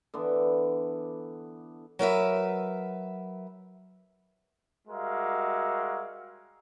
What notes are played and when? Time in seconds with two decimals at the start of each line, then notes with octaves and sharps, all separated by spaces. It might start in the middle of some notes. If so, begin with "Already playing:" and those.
0.14 D3 E3 B3
1.99 F#3 A#4 B4 E5
4.88 G3 G#3 F#4 A#4 E5 F5